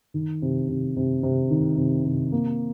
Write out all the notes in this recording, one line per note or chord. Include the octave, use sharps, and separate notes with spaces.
D#3
C3
C3
C3
C3
D#3
C3
C3
A#3